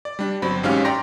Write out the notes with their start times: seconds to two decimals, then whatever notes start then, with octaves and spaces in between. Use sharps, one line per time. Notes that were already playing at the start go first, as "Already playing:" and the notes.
0.05 D5
0.19 G3 D4
0.42 G1 F#3 C4 B5
0.63 A1 G#2 C#4 G4 F5 F6
0.85 D5 G5 A#5 C6 A#6